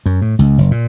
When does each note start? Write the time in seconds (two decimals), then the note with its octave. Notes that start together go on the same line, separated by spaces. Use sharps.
0.06 F#2
0.22 A2
0.39 C#2
0.58 F#1
0.71 A#2